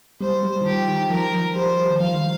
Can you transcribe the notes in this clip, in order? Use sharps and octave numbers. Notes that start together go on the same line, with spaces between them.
G3 C5
G3
D#3
F3 G4
D#3
F3 A#4
F3
G3 C5
G3
D#3
F3 F5
D#3